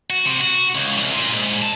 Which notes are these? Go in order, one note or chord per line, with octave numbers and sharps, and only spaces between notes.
F#4
C3
F#4
C#2
C2
A#2
G#2
A5